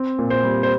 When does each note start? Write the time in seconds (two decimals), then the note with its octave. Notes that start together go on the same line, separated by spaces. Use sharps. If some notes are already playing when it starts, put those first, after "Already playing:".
Already playing: C4
0.19 A#2
0.30 C5
0.44 G3
0.63 C5